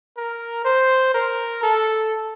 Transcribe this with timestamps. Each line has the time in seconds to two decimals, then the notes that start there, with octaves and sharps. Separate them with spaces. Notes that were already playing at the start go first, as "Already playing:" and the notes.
0.17 A#4
0.65 C5
1.14 A#4
1.63 A4